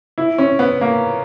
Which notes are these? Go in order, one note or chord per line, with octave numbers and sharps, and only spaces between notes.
E4
C#4
B3
A#3